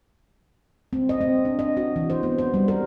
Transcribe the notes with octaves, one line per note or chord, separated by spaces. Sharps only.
C4
D#5
C4
D4
D#5
F#4
E3
C5
B3
C5
G3
A#4